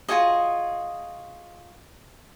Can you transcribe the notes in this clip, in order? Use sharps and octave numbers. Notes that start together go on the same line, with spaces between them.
F4 F#4 G#4 D#5